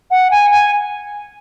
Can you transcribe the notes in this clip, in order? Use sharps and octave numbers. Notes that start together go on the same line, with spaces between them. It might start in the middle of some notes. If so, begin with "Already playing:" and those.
F#5
G#5
G#5